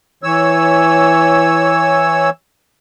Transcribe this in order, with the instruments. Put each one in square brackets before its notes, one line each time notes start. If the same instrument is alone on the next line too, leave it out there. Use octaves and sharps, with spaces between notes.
[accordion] E3 C#5 E6